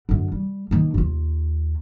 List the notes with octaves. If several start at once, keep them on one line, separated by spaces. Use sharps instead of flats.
F#2 D3
G3
D#3 A#3
D#2 F4